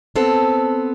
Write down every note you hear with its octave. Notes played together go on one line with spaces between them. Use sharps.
B3 C4 A4